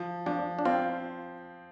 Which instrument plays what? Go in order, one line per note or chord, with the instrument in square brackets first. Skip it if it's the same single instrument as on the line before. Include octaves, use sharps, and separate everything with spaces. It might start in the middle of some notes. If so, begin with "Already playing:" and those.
Already playing: [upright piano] F3
[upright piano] F3 [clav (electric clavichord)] D4
[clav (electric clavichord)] D4
[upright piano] C4 [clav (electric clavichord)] F4